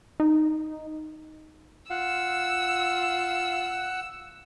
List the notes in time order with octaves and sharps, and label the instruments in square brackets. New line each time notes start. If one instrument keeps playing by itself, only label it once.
[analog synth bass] D#4
[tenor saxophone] F4 [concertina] F#5 [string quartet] E6